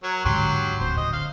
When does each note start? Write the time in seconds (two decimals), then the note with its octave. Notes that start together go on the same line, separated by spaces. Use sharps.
0.03 F#3 A#4 C#5
0.25 G#2 D3 F#3 G4 C6
0.81 D1 C5
0.97 D3 D#5
1.13 F5